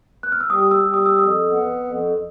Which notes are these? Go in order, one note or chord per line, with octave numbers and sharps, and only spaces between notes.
F#6
F6
E6
G3 D#6
E6
G3
D#6
E6
F2 D#6
B3
F2